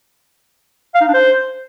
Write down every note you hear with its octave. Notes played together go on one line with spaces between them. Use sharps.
F5
D#4
D4
C5